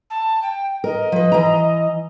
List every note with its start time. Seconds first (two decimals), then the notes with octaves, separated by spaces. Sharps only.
0.10 A5
0.42 G5
0.84 A#4 D#5
1.12 F3 B4
1.32 E3 A#5